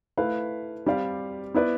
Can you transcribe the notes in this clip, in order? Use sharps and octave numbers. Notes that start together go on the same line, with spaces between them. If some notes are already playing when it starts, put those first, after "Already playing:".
A3 E4 B4 F5
G3 C4 G4 D5 F5
B3 E4 B4 D5